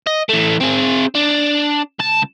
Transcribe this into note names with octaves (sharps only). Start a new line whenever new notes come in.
D#5
E3 A3
C4 G#4
D4
C#2 A5